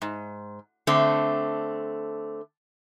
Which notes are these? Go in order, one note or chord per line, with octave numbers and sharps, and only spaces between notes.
G#2
D3 A3 C4